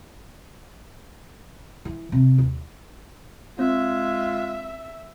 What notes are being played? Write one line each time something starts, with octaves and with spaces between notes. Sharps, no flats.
E3
C3
D#2
G#3 C4 F4 E5